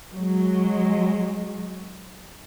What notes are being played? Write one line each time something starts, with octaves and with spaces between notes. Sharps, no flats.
F#3 G#3